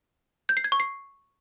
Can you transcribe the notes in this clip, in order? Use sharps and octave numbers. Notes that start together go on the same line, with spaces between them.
G6
C7
G#6
C#6
C7